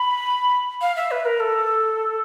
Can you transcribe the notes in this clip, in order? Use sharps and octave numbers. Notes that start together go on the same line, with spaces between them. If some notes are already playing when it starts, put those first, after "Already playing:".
Already playing: B5
F5
E5
B4
A#4
A4